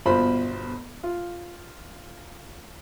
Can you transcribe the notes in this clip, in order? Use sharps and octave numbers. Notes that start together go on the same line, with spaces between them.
G1 B2 F4 C5 B5
F4